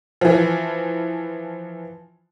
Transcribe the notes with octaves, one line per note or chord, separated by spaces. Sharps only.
E3 F3